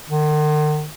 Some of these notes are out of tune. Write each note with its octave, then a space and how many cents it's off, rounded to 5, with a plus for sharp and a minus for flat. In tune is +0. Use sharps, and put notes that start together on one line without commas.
D#3 -45